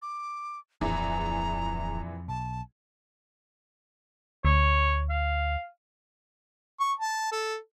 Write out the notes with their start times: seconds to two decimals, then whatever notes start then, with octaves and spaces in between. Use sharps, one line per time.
0.02 D6
0.81 D1 A#1 F2 E3 G#4 A#5
2.28 B1 A5
4.45 D2 C#5
5.10 F5
6.80 C#6
7.00 A5
7.32 A4